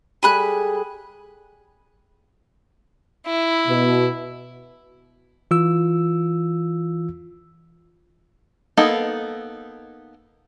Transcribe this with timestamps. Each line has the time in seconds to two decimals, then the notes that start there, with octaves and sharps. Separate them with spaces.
0.23 G3 G#4 A4 G#5 B5 F#6
3.26 E4
3.68 B2
5.51 E3 F4 E6
8.77 A#3 B3 D#4 A4